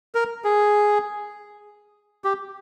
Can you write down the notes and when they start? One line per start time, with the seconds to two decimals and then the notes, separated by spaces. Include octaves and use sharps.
0.15 A#4
0.44 G#4
2.24 G4